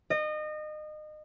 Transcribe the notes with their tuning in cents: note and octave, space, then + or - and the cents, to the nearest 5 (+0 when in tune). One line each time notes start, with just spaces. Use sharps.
D#5 -30